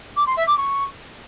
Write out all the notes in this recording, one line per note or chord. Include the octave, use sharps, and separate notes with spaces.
D6
C6
E5
D6
C#6